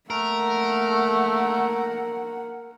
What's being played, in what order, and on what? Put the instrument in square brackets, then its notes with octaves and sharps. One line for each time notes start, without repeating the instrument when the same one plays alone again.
[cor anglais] A3 [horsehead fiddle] A#3 F#5 [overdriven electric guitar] A#4